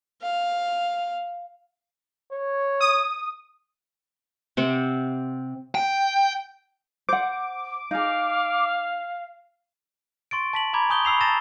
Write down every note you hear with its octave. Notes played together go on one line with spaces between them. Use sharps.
F5
C#5
D#6
C3 C4 F#5
G5
C5 F#5 D6
D#4 G#4 F5
C6 C#6 A6 D7
A5 B6 F#7
A#5 B5 D6 G#6
G#5 C#6 D#6 G6 G7
B5 C#6 E6 C7 F7
A5 A#5 E6 A6 A#6 E7